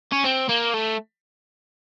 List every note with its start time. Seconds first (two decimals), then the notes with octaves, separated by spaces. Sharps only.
0.12 C#4
0.24 C4
0.49 A#3
0.74 A3